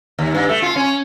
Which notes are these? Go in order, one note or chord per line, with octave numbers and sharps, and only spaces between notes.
D#2
G2
A3
F4
C#4